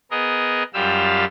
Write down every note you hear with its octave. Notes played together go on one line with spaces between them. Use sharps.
B3 G#4 A#4 D#5
F#2 G3 F4 G4 F5 E6